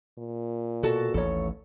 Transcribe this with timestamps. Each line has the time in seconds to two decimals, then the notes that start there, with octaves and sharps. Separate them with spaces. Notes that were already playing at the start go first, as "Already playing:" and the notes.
0.19 A#2
0.83 B2 F#4 A4 A5
1.14 A1 D#2 A2 A4 C#5